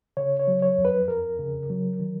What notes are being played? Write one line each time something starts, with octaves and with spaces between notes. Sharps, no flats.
C#3 C#5
C#5
F#3
C#5
F2
B4
F2 A#4
C#3
F#3
D#3